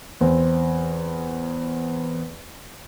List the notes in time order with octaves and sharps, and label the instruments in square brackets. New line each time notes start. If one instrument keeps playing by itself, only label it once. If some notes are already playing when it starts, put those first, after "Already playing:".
[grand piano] E2 C4